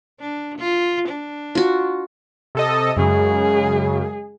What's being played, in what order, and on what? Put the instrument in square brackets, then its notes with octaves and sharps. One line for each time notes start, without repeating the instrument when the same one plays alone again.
[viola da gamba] D4
F4
D4
[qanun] F4 F#4
[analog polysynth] C3 A4 D#5
[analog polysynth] F#2 C#3 [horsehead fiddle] G#3 G#4